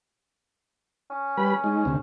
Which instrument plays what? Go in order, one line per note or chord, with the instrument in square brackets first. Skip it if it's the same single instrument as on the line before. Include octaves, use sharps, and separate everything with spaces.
[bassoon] C#4
[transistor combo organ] G3 B4 B5
G#3 D#4
D2 C3